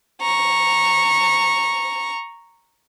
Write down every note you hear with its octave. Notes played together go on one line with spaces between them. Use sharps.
A#5 C#6